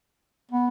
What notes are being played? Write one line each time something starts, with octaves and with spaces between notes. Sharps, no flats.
B3